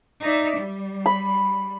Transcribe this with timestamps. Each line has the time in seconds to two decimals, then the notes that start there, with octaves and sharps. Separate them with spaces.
0.21 D#4 D5 E5
0.57 G3
1.06 B5